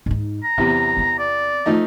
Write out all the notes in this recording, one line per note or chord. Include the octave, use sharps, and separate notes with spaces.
G#2 D#4
A#5
E2 C3 F#3
B3 C4
D5
F3 A3 D#4